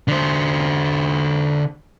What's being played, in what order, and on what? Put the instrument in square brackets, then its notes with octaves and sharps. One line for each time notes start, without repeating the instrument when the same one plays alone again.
[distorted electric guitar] D3 C5